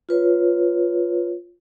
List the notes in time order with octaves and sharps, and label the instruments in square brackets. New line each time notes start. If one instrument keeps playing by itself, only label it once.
[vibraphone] F4 B4 C#5